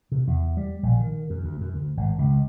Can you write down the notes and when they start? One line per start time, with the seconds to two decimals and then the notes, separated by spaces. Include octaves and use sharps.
0.12 C3
0.27 E2
0.57 G3
0.83 A#1
1.00 D#3
1.30 F#2
1.43 D2
1.61 F#2
1.74 D2
1.97 G#1
2.18 C#2